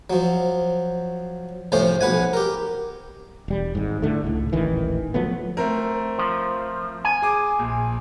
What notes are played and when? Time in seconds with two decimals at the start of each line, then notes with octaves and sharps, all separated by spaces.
0.10 F3 F#3
1.72 C2 A2 F3 C#4 C5
2.01 B1 B4 F#5 G#5
2.33 G4 A#4
3.48 E1 G3
3.75 G#1 G#2
4.02 A2 D3 A3
4.24 C#2 A2
4.53 D#1 A1 D#3 E3
5.14 F3 F#3 A3 B3
5.57 A3 C4 A#4
6.18 F3
7.05 G#5
7.22 G#4 D6
7.59 A#1